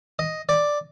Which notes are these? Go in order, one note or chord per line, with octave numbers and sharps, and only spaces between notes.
D#5
D5